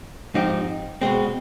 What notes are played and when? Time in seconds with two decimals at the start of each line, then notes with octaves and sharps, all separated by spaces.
0.34 G#2 F3 C4 D#4 G4
1.01 B2 G#3 C4